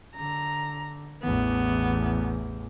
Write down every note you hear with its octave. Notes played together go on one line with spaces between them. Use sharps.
D3 A#5
A1 E2 B3